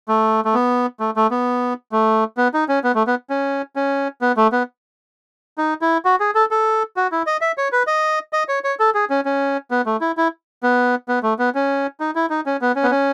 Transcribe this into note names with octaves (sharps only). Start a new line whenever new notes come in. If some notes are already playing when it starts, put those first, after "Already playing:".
A3
A3
B3
A3
A3
B3
A3
B3
D#4
C#4
B3
A3
B3
C#4
C#4
B3
A3
B3
D#4
E4
F#4
G#4
A4
A4
F#4
E4
D#5
E5
C#5
B4
D#5
D#5
C#5
C#5
A4
G#4
C#4
C#4
B3
A3
E4
E4
B3
B3
A3
B3
C#4
D#4
E4
D#4
C#4
B3
C#4
B3
C#4